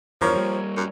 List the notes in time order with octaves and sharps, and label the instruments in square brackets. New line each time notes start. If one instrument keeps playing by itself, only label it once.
[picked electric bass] E2 G2 E3 [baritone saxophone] F3 [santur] A#4 C#5
[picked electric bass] G3 A#3
[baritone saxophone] F#2